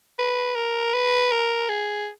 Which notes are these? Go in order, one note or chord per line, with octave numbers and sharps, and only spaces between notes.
B4
A#4
B4
A#4
G#4